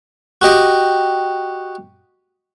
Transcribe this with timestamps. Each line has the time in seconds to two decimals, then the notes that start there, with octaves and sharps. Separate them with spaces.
0.42 F#4 G4 D#5 G5